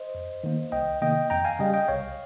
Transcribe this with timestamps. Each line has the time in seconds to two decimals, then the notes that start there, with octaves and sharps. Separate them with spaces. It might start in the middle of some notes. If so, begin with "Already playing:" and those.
Already playing: C5 D#5
0.15 F2
0.44 D#3 A#3
0.72 C2 D#5 G5
1.02 C3 D#3 A#3 D#5 G5
1.30 F2 G5 A#5
1.45 F5 G#5
1.59 C#3 G3 D#5 G5
1.74 D#5 G5
1.88 C2 C#5 F5